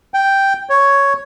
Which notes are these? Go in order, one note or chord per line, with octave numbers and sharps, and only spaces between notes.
G5
C#5